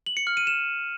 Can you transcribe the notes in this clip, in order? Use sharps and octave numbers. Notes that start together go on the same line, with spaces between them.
F#7
C#7
F6
D#7
E7